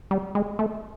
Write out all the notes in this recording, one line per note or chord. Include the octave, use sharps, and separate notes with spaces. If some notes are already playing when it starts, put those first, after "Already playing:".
G3
G#3
A3